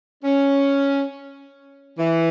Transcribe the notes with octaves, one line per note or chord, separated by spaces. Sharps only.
C#4
E3